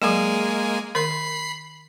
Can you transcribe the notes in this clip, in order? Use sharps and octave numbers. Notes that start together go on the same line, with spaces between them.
F#3 G#3 A#3 G#4 G#5
D#3 A#4 B5 C6 C7